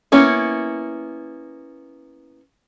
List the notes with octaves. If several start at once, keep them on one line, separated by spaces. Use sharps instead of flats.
A#3 B3 C#4 E4